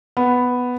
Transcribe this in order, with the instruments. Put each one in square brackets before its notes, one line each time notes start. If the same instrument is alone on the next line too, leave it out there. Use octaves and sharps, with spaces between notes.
[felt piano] B3